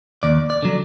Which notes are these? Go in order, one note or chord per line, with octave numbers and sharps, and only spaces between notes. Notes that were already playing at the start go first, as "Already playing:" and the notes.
D#2 D5
D5
D3 F#3